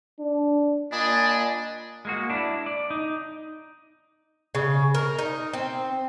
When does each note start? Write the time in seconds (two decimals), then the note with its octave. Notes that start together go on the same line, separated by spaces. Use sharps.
0.19 D4
0.92 A#2 D4 D#5 G#5 B5
2.05 G#3 A#3 F#4
2.30 D4 E4
2.66 D5
2.90 D#4
4.55 C#3
4.95 A#4
5.19 D#4
5.53 C4